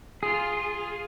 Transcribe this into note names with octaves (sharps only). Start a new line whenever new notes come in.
F4 G#4